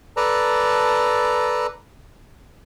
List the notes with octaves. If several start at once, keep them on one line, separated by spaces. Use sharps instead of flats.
A4 B4 D5 A5 A#5